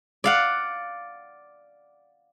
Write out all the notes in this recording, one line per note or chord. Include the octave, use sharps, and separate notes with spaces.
D5 F5 F#5